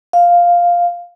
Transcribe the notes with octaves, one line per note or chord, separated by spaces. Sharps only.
F5